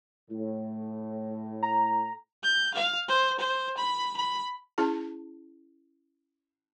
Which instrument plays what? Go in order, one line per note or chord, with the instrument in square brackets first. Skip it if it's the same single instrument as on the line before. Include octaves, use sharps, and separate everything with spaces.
[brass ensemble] A2
[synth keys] A#5
[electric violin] G6
F5
C5
C5
B5
B5
[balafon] C#4 E4 G#4 A5